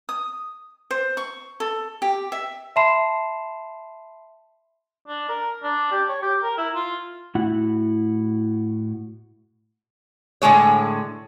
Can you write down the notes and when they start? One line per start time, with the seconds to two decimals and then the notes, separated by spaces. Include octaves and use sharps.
0.09 D#6
0.91 C5
1.17 C#6
1.60 A4
2.02 G4
2.32 E5
2.76 E5 A5 B5 C6 C7 E7
5.08 D4
5.29 A#4
5.63 D4
5.92 G4
6.09 C#5
6.22 G4
6.43 A#4
6.58 E4
6.75 F4
7.35 A2 E4 F#4 F#5
10.42 A2 D3 G#3 C#5